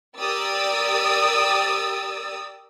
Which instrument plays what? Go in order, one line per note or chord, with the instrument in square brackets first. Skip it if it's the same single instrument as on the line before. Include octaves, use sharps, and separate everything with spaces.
[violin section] G4 A#4 D5 D#6 E6 A6